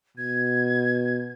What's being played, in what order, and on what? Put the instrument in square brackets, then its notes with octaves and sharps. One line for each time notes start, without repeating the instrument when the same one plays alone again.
[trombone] B2 [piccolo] G#6